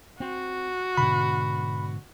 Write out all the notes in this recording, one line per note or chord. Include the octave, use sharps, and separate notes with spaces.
C4 F#4
G#2 B2 D3 B5